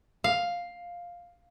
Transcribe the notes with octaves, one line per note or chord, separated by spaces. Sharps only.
F5